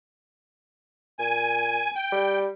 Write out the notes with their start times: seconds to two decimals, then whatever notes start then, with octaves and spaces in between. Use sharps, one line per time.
1.19 A#2 G#5
1.96 G5
2.12 G3